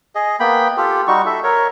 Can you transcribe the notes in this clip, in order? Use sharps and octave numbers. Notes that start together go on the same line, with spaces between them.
G#4 D#5
A#3 B3 G5 B5
F4 G4 A4
G3 D#4 F#4 C#6
A4 E5
A#4 C#5